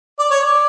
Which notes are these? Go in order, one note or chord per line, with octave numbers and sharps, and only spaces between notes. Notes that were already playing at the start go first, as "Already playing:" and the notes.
D5
C#5
D5